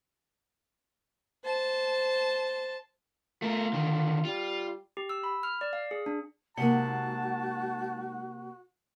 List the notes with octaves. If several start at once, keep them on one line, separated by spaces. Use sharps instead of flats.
C5 A5
A3 F4 A#4
D3 D#3
G3 F4
G4
E6
B5
F6
D5
F5
G#4
D4
C3 G#3 A#3 D#4 F#4 F#5 A5